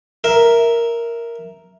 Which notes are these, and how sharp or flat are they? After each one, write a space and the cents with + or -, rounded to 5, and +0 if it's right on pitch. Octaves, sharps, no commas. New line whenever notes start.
A#4 +0 E5 +0